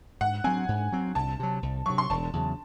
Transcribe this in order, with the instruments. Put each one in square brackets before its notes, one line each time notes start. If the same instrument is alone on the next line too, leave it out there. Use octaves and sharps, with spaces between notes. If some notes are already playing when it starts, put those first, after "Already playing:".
[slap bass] G#2 [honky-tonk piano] F#5
[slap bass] F#3 C4 [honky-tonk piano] G#5
[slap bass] G#2
F#3 C4
[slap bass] C2 [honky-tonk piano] A5
[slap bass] C3 F#3
C2
[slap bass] C3 F#3 [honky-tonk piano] C#6
[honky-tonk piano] C6
[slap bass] E1 [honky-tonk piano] A5
[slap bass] E2 C#3 F#3